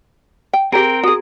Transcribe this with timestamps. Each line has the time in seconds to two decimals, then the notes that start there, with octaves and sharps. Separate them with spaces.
0.53 G5
0.72 C4 G4 G#4 A#4 G5
1.03 F#4 G#4 D#6